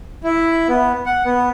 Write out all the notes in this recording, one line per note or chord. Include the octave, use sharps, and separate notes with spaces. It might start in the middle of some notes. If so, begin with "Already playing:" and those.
E4
B3
F#5
B3